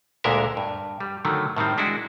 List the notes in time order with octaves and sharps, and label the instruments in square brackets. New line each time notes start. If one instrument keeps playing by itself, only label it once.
[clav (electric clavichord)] D2 A#2 D3 G#3 A#4 E5
G2
G3
D3 D#3 F#3 A3
A2 D#3 G3 C4
G#3 D4 E4 F#4